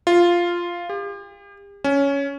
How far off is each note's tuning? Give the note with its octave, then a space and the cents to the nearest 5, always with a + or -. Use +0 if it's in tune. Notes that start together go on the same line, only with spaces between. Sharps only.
F4 -5
G4 +40
C#4 +10